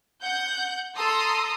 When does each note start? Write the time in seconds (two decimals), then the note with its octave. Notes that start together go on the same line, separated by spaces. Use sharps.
0.23 F#5 G6
0.96 A4 A#5 C6 D#6